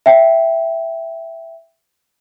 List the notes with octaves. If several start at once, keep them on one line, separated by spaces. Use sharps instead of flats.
E5 G5